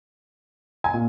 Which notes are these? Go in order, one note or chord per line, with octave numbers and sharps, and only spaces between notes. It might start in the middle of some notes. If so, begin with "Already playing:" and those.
G#5
A#2